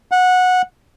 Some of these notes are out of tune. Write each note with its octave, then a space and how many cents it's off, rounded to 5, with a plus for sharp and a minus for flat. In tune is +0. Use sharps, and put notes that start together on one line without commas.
F#5 -15